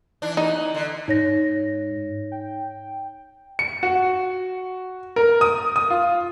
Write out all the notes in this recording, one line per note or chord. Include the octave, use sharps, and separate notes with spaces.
E3 D4
E3 D#4
D3
G#2 D#4 C#5 A#6
G5
C#7
F#4
A#4
D#6
D#6
F4